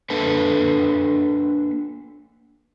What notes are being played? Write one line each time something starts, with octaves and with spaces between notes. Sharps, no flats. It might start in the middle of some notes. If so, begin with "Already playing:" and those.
A#3 D4 A4 B4 A5